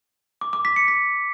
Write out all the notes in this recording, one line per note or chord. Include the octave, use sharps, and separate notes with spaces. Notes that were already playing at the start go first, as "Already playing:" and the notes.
D6
D6
B6
C#7
B6